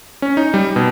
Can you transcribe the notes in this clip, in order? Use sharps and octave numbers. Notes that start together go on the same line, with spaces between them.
C#4
D#4
G3
B2